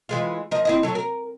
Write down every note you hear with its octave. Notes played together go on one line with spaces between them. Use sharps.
E3 G#3 F4
F3 A#4 D#5
C4 E4 D#5
F#3 A4
A#4